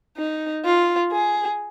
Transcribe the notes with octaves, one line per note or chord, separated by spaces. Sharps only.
D#4
F4
G#4